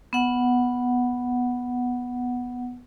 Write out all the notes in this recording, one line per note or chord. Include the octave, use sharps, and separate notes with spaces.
B3 F#5